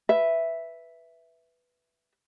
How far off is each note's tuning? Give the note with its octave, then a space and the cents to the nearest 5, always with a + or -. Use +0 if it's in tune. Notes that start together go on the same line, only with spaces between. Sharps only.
B4 +0 E5 +0